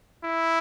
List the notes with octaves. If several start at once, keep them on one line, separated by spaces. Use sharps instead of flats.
E4